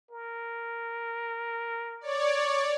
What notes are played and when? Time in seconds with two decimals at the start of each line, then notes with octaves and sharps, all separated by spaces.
0.11 A#4
2.01 C#5 D5